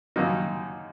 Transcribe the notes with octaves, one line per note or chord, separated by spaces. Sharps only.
F#2 D#3 A#3 D#4